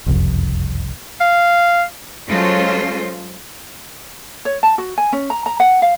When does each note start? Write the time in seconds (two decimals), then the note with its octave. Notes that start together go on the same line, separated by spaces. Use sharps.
0.06 F#1 C2 F2
1.21 F5
2.28 F#3 G#3 C#4 F4 A4 C5
4.45 C#5
4.63 A5
4.78 F#4
4.98 G#5
5.13 C#4
5.30 A#5
5.46 A#5
5.60 F#5
5.82 F5